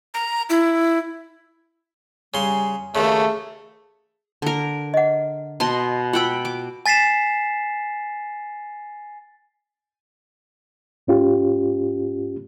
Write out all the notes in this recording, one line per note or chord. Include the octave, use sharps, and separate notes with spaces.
A#5
E4
C#3 G3 G#5 C6
D#2 C#3 A3 G#4
D3 A#4
D#5 F#5
B2 D#5 A5 C6
F4 F#5 G5 B5 E6
D6
G#5 A6 B6 C7 E7
G#2 C#4 F4 G4